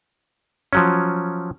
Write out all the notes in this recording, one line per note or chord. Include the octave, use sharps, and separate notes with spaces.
F3 F#3 C#4